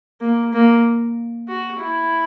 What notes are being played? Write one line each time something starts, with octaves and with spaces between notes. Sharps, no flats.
A#3
A#3
F#4
E4